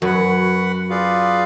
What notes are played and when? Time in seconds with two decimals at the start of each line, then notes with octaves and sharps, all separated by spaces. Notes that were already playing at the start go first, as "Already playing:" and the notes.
0.02 F#2 F#4 B4 F#5
0.89 F4 G#4 B4 D5 F5